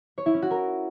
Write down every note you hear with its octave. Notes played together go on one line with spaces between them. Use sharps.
C#5
E4
C#4
F#4
A#4